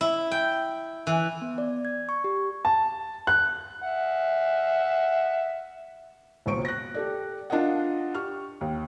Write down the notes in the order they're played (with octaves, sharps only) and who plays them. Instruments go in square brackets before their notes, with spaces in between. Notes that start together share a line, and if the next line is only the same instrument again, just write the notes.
[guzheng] E4
G5
E3
[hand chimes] B3
D5
G#6
C#6
G4
[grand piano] A5
F#6
[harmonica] E5 F#5
[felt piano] E1 C#2 A#2 C5 C#6 D7
F#6 A#6
G4 A4 D5
D4 F4 A#4 D#5 F#5
G4 C#6 F6
D#2